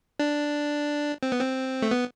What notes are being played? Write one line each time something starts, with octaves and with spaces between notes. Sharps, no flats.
D4
C4
B3
C4
A3
B3